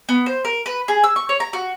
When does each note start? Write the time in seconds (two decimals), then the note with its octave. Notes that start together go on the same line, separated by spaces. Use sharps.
0.09 B3
0.26 C5
0.45 A#4
0.66 B4
0.88 G#4
1.04 E6
1.16 C#6
1.29 C#5
1.40 A#5
1.53 F#4